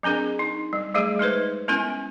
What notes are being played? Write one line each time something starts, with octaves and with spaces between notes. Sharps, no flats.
F#3 C4 D4 G#4 A#4
D#4
G3
F#3 G3 A3 G#4
G#3 D#4 B4 C5
G#3 B3 C#4 E4 A#4 G#5